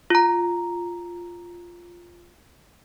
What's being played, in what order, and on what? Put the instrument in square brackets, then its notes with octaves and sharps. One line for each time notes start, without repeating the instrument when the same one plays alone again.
[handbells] F4 A#5